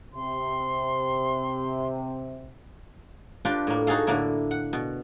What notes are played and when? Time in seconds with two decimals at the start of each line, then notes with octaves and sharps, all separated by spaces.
0.13 C3 C6
3.45 D4 F4 G4 B4 G5 A#5
3.67 A2 A#3
3.87 D#4 F#4 G#4 A4 F5
4.07 A2 D3 A#3 E4
4.51 F#5
4.73 B2